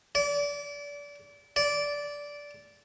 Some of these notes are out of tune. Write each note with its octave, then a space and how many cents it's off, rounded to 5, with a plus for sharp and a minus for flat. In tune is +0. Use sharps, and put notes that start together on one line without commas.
D5 -30
D5 -15